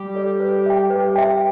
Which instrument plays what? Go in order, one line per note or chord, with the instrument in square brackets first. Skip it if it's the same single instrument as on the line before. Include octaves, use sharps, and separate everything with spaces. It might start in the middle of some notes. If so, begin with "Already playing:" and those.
Already playing: [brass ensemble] G3 G4
[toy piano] A4 D5
B4
E5 G5
[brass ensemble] G3 G4 [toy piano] B4
[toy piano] E5 G5